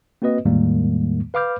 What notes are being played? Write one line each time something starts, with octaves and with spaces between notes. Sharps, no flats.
A#3 C4 F#4 B4 D#5
E2 A2 D#3 G3 G#3 A#3
B4 F5 B5 D6 F6 G6